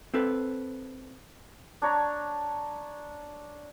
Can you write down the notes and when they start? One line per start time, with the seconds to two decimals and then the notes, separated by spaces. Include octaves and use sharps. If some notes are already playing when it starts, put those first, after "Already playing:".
0.14 C4 A4 B4
1.82 D4 C#5 A#5